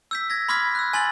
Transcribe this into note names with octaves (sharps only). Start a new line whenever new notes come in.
E6 G6 B6
G#6 A#6
B5 C6 D6 F6 G#6 B6
E6 F#6
G#5 C6 A6 F#7